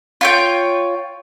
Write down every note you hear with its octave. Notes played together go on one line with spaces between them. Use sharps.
F4 C#5 G5